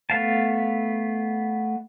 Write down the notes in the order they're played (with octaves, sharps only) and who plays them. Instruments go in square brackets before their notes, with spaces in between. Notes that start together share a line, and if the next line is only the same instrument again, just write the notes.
[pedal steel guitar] A3 B3 F5 A5